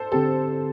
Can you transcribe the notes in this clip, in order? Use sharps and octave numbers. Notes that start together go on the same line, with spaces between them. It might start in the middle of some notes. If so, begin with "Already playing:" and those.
Already playing: A4 C5
D3 C4 G4 A4